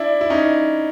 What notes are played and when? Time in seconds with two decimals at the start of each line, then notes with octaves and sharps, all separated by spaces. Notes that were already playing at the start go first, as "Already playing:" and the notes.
Already playing: D4 E4
0.21 E4
0.30 C#4 D#4